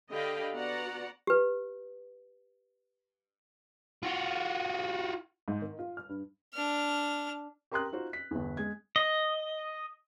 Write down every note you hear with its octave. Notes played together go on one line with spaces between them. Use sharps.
D3 G4 D#5 F5 G5 B5
B3 F#4 D5 F#5 A#5
G4 B4
F4 F#4
G#2
D#3
F4
F6
G2
D4 F6
G4 A#4 A#5 C6 D#6 F#6
D#4 F4 F#4 C5
B6
G1 E2
G#3 G#6
D#5